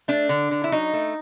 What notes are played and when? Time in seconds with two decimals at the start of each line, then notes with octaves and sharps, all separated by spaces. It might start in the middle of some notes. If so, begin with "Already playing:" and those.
0.08 A3 D4
0.29 D3
0.51 D3
0.64 E4
0.72 F#3 D#4
0.93 A3